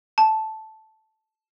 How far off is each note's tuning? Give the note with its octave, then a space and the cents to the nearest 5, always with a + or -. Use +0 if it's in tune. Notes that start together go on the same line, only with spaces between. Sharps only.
A5 -5